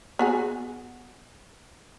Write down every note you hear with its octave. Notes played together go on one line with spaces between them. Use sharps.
B3 F#4 G#4